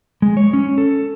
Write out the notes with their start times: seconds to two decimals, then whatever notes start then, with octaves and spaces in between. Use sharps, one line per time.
0.22 G#3
0.37 C#5
0.53 C#4
0.78 A4